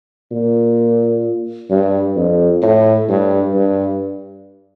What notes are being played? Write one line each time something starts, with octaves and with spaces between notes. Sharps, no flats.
A#2
G2
F2
A2
G2
G2